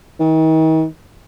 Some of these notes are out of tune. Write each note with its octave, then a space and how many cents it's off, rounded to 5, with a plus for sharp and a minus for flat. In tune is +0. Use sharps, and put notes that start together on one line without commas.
D#3 +40